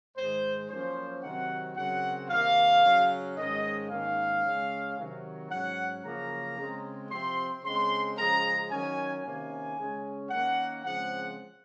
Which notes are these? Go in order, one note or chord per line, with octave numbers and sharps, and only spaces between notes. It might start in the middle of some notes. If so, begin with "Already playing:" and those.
G#2 D#3 G#3 C5
F#2 F3 A#3 C#4 C5
C3 D#3 F#3 C4 F#5
F#2 C#3 F#3 C4 F#5
C3 D#3 A#3 F5
C#3 F#3 C#4
G#2 D#3 G#3 C#4 D#5
G#2 D#3 A#3 C#4 F5
C#3 G#3 C#4
C3 D#3 F#3
G#2 F#3 C#4 F#5
F#2 C#3 F3 A#3 C#4 A#5
C#3 G#3 C4
C3 F3 C4 C6
C#3 G#3 C4 C6
C#3 F3 G#3 C#4 A#5
F#2 D#3 F#3 C#4 G#5
C3 D#3 A#3 C#4 G#5
C#3 G#3 C#4
D#3 A#3 C#4 F#5
C#3 F3 G#3 C4 F#5